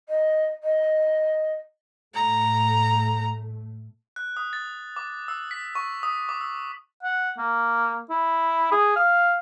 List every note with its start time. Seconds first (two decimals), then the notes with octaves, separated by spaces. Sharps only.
0.09 D#5
0.64 D#5
2.15 A2 A3 A#5
4.16 F#6
4.37 D#6
4.53 A6
4.96 D6
5.28 E6
5.51 B6
5.75 C#6
6.03 D#6
6.29 D6
6.41 E6
7.03 F#5
7.38 A#3
8.10 E4
8.72 G#4
8.96 F5